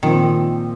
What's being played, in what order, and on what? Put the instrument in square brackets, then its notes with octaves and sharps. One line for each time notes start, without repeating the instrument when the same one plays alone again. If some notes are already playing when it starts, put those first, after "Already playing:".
[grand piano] A#2 F3 C4 [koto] D#3